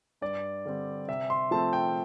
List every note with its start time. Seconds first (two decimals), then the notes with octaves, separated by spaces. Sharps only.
0.21 G2 D5
0.65 D3 G3 C4
1.08 C3 E5
1.30 C6
1.51 F3 A3 C4 A5
1.73 G5